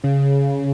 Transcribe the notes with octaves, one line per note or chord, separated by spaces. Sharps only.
C#3